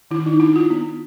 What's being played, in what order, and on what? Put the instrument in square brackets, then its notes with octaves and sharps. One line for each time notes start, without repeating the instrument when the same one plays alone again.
[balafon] D#3 E4
D#4
D4 E4
F4
B3